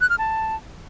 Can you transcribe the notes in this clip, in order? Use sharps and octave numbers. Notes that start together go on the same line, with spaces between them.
F#6
F6
A5